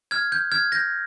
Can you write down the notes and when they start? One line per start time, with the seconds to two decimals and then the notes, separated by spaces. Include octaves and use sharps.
0.11 F6 G#6
0.32 G6
0.52 F6 G#6
0.72 G6 A#6